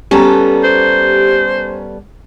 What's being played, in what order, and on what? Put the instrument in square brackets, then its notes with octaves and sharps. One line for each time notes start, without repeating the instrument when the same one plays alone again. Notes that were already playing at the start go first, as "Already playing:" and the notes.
[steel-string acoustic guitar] G3 B3 A4 [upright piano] C#4 A5 A#5 [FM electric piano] G4
[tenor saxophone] C5